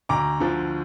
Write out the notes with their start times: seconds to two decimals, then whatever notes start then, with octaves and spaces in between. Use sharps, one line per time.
0.09 D2 A#5 D6
0.40 D3 F3